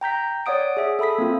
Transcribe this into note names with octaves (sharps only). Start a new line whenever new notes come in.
G5 A#5 G6 B6
C#5 D5 F#5 D#6 D7
G#4 E5 D#6
A4 E5 B5 D#6 B6
A#3 C4 F4